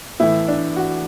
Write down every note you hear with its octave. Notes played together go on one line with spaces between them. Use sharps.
A2 E3 A3 E4
D4
F#4